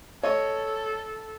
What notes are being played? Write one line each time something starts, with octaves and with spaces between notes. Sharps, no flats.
A4 C#5 D#5 C#6